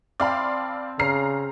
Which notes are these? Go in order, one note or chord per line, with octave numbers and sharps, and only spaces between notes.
C4 D5 F5 A5 B5
C#3 A#5 F6 C7